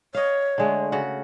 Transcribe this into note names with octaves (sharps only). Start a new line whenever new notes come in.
C#5 D#5 F5
D3 G#3 A3
C#3 F#4 F#5